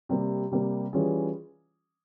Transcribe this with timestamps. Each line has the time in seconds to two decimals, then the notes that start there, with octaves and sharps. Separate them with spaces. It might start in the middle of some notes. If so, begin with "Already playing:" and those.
0.09 C3 G3 A#3
0.51 C3 G3 A#3
0.93 E3 G3 C#4 F4 G#4